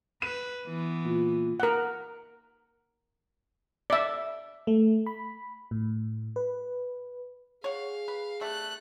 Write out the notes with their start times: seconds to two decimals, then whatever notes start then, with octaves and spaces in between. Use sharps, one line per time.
0.22 B4 D#7
0.66 E3 B3
1.04 A#2
1.60 A#4 F#5
3.90 D5 E5
4.67 A3
5.06 B5
5.71 A2
6.36 B4
7.64 G#4 C#5 F5 F#5
8.08 B4
8.41 G3 A3 F#6